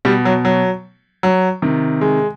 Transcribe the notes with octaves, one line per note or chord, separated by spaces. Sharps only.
B2 G3
F#3
F#3
F#3
C3 D#3
G#3